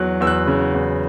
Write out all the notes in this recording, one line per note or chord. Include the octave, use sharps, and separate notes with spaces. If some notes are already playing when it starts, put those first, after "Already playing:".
Already playing: E2 F#3 F#6
E2 E6
F#6
C#3
E2